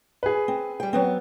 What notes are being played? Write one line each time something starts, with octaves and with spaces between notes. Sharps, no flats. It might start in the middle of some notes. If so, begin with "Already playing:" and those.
G#4 B4
C4
G3 G5
F#3 B3 C4